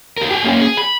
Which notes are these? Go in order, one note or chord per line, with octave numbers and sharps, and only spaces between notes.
G4 A#4
G4 G#4
A#3 C#4
G#4
B5